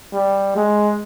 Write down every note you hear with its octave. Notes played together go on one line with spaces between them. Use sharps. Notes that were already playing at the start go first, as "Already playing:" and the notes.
G3
G#3